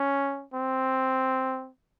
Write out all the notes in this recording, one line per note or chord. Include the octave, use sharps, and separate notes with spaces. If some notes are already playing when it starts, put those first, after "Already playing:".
Already playing: C#4
C4